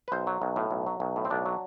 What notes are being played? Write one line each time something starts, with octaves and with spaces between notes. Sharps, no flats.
B4
B1 C5
F#3
B1
A2
B1
F#3
B1
A2
C4
B1 D4
F#3